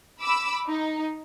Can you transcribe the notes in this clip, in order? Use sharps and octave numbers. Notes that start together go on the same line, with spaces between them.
B5 D6 E6
D#4